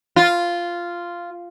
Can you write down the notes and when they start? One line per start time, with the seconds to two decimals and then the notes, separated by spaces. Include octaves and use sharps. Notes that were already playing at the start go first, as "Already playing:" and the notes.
0.16 F4